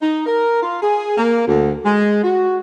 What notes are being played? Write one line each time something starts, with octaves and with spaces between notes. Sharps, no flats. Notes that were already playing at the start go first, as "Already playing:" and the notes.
D#4
A#4
F4
G#4
A#3
D2
G#3
F#4